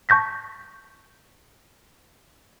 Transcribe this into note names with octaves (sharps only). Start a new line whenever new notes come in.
A5 C#6 G6 A#6 B6